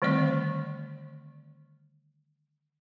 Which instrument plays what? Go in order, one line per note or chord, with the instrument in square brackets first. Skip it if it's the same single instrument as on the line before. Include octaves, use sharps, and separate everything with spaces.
[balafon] D3 D#3 G3 A3 C4 D5